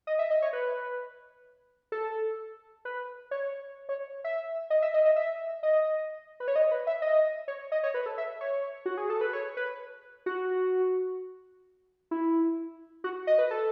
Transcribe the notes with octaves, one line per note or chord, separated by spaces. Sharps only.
D#5
E5
D#5
C#5
B4
A4
B4
C#5
C#5
E5
D#5
E5
D#5
D#5
E5
D#5
B4
C#5
D#5
B4
E5
D#5
C#5
D#5
C#5
B4
A4
E5
C#5
F#4
G#4
A4
B4
C#5
B4
F#4
E4
F#4
D#5
B4
A4